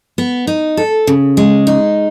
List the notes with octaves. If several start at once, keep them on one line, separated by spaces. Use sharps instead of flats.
B3
D#4
A4
C#3
G#3
D#4